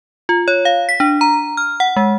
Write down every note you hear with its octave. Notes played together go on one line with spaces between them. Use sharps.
F4
C#5
F5
B6
D4
A#5
F6
F#5
G#3